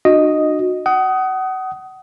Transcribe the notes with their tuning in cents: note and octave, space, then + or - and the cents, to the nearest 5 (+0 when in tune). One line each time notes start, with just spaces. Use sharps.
D4 +45 F#4 -20 D#5 +0
F#5 +30 D#6 +10